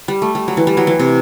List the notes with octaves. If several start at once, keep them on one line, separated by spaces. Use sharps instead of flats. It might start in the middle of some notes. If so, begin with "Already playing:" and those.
G3
A3
G3
F#3
E3
G3
F#3
E3
C3